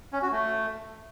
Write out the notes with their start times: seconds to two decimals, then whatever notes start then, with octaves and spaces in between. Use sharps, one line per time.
0.13 C#4
0.22 F#4
0.32 A3